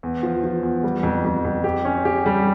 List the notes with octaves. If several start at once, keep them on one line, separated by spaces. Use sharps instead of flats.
E2
F3
F3
E2
G3
F2
F2
F2
G4
C#4
G4
G3